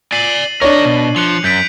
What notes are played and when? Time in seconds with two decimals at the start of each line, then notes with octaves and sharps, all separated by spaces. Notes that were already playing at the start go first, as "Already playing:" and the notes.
0.12 D5 G#5 C7 D#7 F#7
0.62 D4 A#4 C#5 D#5
0.85 B2
1.16 F3 F#6 C#7 F7
1.44 F#2 G6 B6 D7